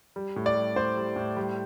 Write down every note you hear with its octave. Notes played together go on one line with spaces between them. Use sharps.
G3
A2
D5
G3
A2 C5
G3
A2
G3